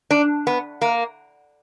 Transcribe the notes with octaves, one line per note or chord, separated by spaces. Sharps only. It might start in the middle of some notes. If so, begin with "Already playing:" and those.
D4
B3
A#3